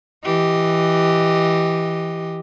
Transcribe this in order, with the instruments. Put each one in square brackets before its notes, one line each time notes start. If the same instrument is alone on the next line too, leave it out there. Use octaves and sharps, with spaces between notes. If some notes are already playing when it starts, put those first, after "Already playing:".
[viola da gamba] E3 G4 D#5